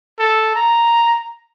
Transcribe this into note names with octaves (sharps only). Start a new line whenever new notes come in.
A4
A#5